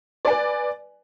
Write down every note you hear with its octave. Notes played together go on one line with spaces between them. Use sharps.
B4 D5 G#5